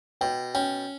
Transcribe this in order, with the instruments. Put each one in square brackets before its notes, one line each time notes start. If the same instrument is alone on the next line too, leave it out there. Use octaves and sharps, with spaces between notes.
[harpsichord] B2 [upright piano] G5
[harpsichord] C#4 [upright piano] G5